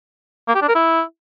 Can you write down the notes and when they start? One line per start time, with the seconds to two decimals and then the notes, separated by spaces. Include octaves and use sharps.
0.48 A#3
0.55 G4
0.62 D4
0.69 A#4
0.75 E4